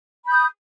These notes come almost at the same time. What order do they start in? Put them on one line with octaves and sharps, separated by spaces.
B5 G6 D#6